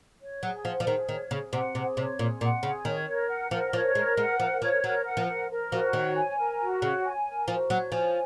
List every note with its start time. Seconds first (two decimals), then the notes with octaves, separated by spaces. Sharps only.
0.21 C#5
0.43 F#3 G#4
0.64 F3 F#5
0.80 F3
0.87 D#3 G#4
1.09 D#3 C#5
1.31 C#3 G#4
1.53 C3 F#5
1.74 C3 G#4
1.97 C3 C#5
2.19 A#2 G#4
2.41 A#2 F#5
2.63 C#3 G#4
2.85 D#3 C#5
3.07 A#4
3.29 F#5
3.51 F3 A#4
3.73 F3 C#5
3.95 G#3 A#4
4.17 G#3 F#5
4.39 F3 A#4
4.62 F3 C#5
4.83 F#3 A#4
5.06 F#5
5.17 F3
5.28 A#4
5.50 A#4
5.72 F3 F#4
5.93 D#3 C#5
6.16 G#5
6.38 A#4
6.60 F#4
6.82 C#3 C#5
7.04 G#5
7.26 A#4
7.48 F3 F#4
7.70 F#3 C#5
7.92 F3 G#5